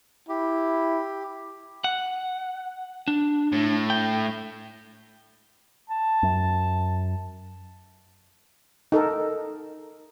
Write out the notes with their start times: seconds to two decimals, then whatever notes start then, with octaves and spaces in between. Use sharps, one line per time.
0.29 E4 G4
1.84 F#5
3.08 D4
3.53 A2
3.90 G5
5.90 A5
6.23 F#2
8.92 D#4 A4 A#4